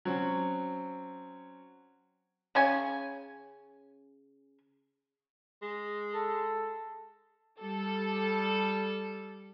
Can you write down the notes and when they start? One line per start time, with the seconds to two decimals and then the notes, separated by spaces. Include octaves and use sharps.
0.05 F#3 C4 C#4
2.55 C#3 C#4 G#5
5.62 G#3
6.14 A4
7.60 G3 A4